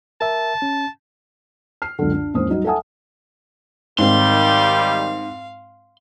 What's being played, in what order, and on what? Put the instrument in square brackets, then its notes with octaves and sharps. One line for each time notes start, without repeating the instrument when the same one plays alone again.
[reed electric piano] A#4 E5 [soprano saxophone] A5
[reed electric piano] C#4
[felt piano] F6 C7
C#2 F#2 D3
D4
D#2 G#2 E3 C#4 C5 D#6
F#3 G3 D#4 F#4
A4 E5 F#5 G#5 A5 D#6
[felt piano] G#2 C4 [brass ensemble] D#3 G3 [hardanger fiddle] F5 [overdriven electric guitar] C6